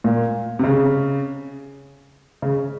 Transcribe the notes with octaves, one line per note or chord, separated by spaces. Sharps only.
A#2
C3
C#3
C#3